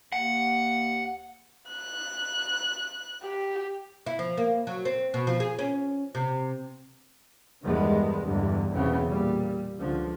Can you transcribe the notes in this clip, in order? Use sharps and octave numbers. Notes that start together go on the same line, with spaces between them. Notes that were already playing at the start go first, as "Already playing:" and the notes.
D#2 F#5
F#6
G4
E4
F3
A#3
F#3
C4
B2
F3
G#4
C#4
C3
E2 G2 D#3 G#3 B3
E2 G2 D3
B1 E2 C#3 E3 B3 C4
A#2 G3
C#2 D3 F3